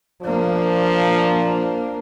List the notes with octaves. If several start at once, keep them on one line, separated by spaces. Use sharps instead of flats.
F3 A#3 D4